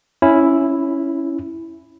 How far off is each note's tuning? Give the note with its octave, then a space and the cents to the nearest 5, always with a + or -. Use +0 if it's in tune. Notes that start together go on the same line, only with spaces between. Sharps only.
C#4 +0 E4 +0